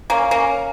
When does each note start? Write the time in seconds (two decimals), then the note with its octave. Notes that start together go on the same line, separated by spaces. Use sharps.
0.10 A#3 C#4
0.31 A#3 C#4